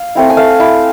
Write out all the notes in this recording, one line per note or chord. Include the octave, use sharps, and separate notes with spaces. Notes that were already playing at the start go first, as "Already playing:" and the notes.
Already playing: F5
A3 C4 E4
G#5
A3 F5
E4